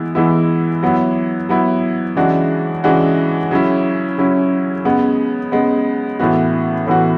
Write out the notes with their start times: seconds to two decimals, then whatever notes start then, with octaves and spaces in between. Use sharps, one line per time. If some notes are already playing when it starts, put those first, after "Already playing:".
Already playing: E3 G#3 B3 E4
0.15 E3 G#3 B3 E4
0.83 F#3 B3 E4
1.49 F#3 B3 E4
2.16 C#3 E3 G#3 D4 F#4
2.84 C#3 E3 G#3 D4 F#4
3.51 C#3 F#3 C#4 E4
4.18 C#3 F#3 C#4 E4
4.85 C#3 G#3 B3
5.52 C#3 G#3 B3
6.19 A2 E3 B3 F#4
6.87 A2 E3 B3 F#4